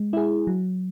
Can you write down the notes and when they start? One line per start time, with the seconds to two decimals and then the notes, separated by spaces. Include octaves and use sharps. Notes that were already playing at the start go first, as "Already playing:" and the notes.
Already playing: G#3
0.13 E4 G#4
0.47 F#3